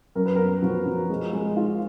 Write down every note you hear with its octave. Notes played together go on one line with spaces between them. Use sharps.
F#2 A#4
B4
B3 A#4
F3 F#4
F3
G#3
G#3
F4